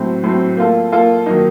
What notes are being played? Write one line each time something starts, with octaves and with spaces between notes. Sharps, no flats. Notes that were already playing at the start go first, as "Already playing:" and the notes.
Already playing: A2 F#3 C4
A2 F#3 C4
A#3 F4 A4
A#3 F4 A4
D#3 F#3 A#3 D#4